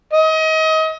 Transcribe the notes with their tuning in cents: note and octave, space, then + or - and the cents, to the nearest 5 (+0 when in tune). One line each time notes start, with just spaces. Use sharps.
D#5 +30